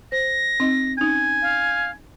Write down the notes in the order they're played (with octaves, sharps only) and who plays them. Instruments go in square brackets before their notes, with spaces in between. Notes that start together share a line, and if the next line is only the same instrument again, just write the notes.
[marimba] C5 [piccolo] A#6
[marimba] C4 D#4 D#5
[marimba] C#4 D#4 [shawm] G#5
[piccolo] F5